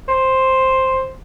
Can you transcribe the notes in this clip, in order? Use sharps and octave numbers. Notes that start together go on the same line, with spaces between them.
C5